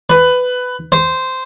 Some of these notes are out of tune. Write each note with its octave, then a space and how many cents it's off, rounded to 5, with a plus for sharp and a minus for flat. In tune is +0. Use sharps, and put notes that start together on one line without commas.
B4 +15
C5 -10